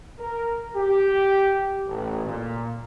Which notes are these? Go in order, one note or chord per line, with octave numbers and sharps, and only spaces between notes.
A#4
G4
A1
A#2